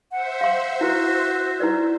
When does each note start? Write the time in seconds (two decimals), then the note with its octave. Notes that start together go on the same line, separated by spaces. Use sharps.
0.11 C5 E5 F#5
0.41 F5 C6
0.81 E4 F#4 B4
1.60 E4 B4 D5